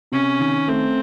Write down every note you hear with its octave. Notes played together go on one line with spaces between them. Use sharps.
C3 C#4
D#3
A3 C4